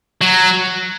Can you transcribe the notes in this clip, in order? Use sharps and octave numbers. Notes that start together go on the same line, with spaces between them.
F#3